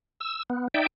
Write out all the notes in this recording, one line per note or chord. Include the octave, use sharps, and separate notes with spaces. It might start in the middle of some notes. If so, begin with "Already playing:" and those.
E6
B3
D#4 D5 E5 G5